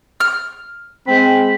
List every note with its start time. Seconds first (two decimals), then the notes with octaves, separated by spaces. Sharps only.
0.20 F6
1.07 G#3 C4 B5